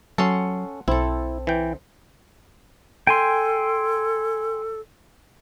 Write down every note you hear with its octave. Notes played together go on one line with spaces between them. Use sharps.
F#3 C#4 A4 F#5 C6
B1 C4 E4 A4
E3 G5
A4 G5 G#5 C6